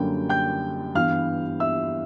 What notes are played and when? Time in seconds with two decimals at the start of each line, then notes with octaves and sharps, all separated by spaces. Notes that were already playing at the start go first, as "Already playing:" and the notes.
Already playing: F#2 D3 G3 A#3 G5
0.29 G5 G6
0.95 G2 E3 G3 B3 F5 F6
1.60 E5 E6